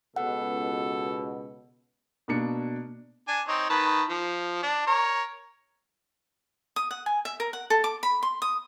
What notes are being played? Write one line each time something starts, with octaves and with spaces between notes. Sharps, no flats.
C#2 B2 A4 F#5
B2 A#3 D4 C#7
D4 G#5
C4 D#4 C#5
D#3 B4 A5
F3
D4
A#4 C#5
D#6
F#5
G#5
E5
A#4
F#5
A4
D6
B5
C6
D#6